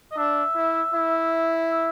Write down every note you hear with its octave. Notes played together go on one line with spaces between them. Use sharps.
D#5
D4 E5
E4
E4
E5